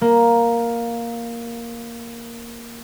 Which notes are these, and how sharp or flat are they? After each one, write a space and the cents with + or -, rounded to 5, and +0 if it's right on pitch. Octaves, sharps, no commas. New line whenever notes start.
A#3 +5